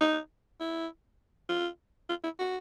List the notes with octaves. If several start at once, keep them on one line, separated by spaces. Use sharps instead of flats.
D#4
E4
F4
F4
E4
F#4